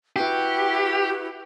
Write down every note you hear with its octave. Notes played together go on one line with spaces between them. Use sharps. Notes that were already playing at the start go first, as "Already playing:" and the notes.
E4 F#4 G4 B4